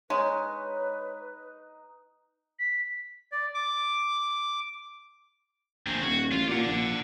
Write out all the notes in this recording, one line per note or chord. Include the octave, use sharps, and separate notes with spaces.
G#3 D#4 B4 C#5
B6
D5
D6
A#1 C4 G#4
D#1 F#4
A1 F4
A#2 D5 F#5
A#1